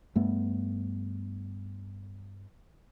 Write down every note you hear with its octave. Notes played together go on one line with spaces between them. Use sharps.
G2 A3 B3